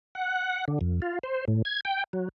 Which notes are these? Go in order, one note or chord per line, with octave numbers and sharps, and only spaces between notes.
F#5
D3
F2
F4
C5
A2
G#6
G5
F#3